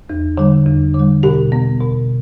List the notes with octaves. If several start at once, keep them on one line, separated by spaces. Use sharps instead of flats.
E2
D3 G3
E2
D3 G3
B2 G4
B3
B2